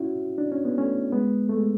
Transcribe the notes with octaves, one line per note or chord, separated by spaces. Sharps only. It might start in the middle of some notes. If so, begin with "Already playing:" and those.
Already playing: C#4 E4 F#4
D4
C#4
B3
A3 C#4
G#3 B3
A3
G#3